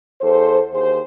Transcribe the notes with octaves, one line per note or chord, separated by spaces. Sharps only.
E2 A4 C5
D#2 G#4 C5